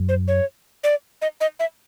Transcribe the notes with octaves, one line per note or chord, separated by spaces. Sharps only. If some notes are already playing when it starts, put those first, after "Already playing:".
Already playing: F#2
C5
C#5
D5
D#5
D#5
E5